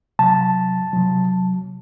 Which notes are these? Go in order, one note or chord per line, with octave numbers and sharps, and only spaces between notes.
C3 F#3 A5
C3 F#3